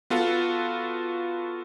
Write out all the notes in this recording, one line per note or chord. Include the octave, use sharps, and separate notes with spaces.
B3 F4 F#4 A4